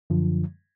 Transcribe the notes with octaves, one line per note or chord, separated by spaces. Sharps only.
F#2 D3 F3